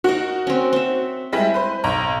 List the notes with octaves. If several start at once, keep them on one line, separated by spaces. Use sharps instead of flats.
D#4 F#4 A#4
C4 C#4
C4 E5
G3 G#3 E4
B4 C5
B1 A#5